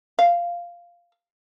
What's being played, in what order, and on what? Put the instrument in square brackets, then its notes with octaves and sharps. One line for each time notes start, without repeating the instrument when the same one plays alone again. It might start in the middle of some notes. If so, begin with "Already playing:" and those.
[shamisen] F5